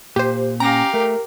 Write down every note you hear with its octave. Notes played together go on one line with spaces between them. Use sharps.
A#2 G4 C5
C#4 G4 F5 A#5 A#6
A3 A#4